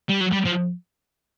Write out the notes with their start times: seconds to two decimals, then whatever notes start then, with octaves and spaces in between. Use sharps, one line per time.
0.09 G3
0.20 F#3
0.33 G3
0.46 F3